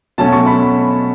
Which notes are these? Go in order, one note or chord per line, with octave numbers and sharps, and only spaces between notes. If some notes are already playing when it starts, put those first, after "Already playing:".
B2 F#3 A3 C#4 A5
C#6
B5